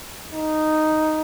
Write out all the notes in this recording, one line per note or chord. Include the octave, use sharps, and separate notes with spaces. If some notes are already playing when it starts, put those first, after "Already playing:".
D#4